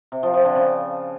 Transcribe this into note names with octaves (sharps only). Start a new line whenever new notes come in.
C3
F3
F3
D3
C#3